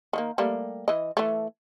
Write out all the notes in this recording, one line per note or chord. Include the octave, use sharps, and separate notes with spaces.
D#3 F#3 A#3
G3 A3 A#3
E3 D#5
E3 A3